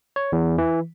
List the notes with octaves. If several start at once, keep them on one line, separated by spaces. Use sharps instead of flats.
C#5
E2
E3